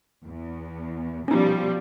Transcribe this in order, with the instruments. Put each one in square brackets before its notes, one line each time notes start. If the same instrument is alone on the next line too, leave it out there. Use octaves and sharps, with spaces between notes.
[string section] E2
[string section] B2 F3 G3 [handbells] C#4 D#4